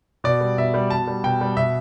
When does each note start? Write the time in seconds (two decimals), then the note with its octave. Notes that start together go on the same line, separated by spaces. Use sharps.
0.24 B2 D5
0.41 G3
0.58 B2 E5
0.74 G3
0.90 B2 A5
1.07 G3
1.24 B2 G5
1.41 G3
1.57 B2 E5